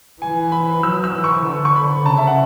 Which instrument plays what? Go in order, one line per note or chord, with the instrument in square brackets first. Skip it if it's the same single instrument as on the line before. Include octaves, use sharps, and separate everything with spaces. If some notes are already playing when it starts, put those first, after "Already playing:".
[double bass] E3 [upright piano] G#5
[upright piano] B5
[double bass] F#3 [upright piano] E6
[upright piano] E6
[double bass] E3
[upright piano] C#6
[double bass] D3
[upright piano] C#6
B5
[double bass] C#3 [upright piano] A5
[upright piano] E5
F#5